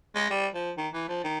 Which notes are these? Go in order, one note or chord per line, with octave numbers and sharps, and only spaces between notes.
G#3
G3
F3
D#3
E3
F3
D#3